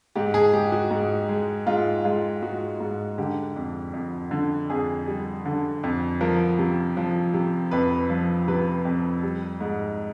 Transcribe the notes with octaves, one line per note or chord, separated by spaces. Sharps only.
G#2 G4
G#4
G#2 G4
F#4
G#2
G#3
G#2 F4
G#3 F4
G#2 F#4
G#2
D3 G4
F2
F2
D3
F2 G#4
G3
D3
F2
F3 A#4
C3
F3
C3
F2 B4
F3
C3 B4
F2
G3
G#2